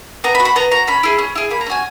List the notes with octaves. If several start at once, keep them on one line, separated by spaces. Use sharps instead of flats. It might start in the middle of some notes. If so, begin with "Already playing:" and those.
B3 A#5
B5
F#4
B5
B3 A#5
F#4 A#5
C#4 B5
E4 G#4
C#4
E4 G#4
A#3 B5
A#5
C#4 F#4 G#5